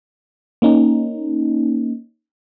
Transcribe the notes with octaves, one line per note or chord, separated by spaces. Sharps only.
A#3 C#4 D#4